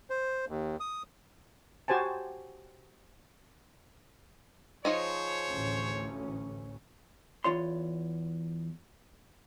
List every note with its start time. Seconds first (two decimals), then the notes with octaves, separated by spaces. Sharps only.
0.10 C5
0.48 D#2
0.80 D#6
1.88 F#4 G4 C5 G#5 A5
4.85 F3 D#4 G#4 C5 C#5 D#5
5.49 A1 D2 C#4
7.44 E2 F4 C#5 C6